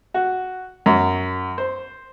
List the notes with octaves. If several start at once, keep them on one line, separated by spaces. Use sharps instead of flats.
F#4
F#2
C5